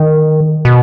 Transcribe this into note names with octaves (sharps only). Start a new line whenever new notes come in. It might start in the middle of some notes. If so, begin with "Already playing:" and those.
Already playing: D#3
B2